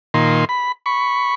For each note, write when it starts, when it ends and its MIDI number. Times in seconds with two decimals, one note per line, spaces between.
0.14 0.45 46
0.14 0.45 51
0.14 0.45 84
0.49 0.72 83
0.86 1.35 83
0.86 1.35 85